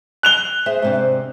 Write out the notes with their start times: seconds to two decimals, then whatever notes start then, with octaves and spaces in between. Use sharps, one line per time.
0.23 F#6 F7 G7
0.66 G#4 C5 E5
0.82 G#2 C3 D4